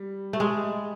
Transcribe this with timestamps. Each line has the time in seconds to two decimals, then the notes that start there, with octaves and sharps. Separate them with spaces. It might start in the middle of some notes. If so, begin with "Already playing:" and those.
Already playing: G3
0.33 A3
0.40 G#3